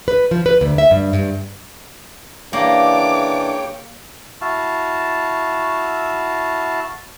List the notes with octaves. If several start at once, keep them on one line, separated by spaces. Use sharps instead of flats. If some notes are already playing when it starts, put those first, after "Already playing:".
B4
F3
B4
D2
E5
G2
G2
C#3 E3 A#3 D4 C#5 D5 G5 D6
E4 F#4 F5 A5